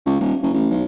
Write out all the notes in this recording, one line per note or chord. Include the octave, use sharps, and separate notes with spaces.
C#2
D#1
F#1
A1
B1